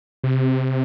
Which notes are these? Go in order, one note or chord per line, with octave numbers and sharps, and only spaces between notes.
C3